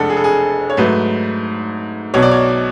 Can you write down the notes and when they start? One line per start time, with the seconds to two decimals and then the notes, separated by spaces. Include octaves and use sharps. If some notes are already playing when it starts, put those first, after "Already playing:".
Already playing: F1 F2 G#3 D4 A4 F#5
0.10 G#4
0.17 A4
0.24 G#4
0.70 C#5
0.77 G#2 F#3 A3 B4
2.14 B1 B2 F#3 C#5
2.22 D5
2.31 C#5